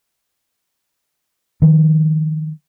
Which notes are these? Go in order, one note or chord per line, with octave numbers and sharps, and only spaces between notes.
D#3 F3